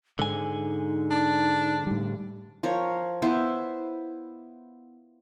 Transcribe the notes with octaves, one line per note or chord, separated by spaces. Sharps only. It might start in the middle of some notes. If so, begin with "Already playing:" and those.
G#2 D3 D#4 G#5
D4
A2 G3
F3 A#4 C#5
B3 E4 C5